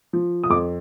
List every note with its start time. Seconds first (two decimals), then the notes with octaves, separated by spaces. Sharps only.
0.13 F3
0.44 D#6
0.50 F2 D6